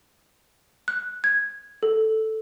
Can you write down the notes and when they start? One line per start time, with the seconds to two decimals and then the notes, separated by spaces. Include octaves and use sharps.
0.88 F#6
1.24 G#6
1.83 A4